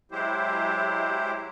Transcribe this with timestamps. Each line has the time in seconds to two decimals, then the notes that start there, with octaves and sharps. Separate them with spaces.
0.12 F#3 G#3 E4 G4 C5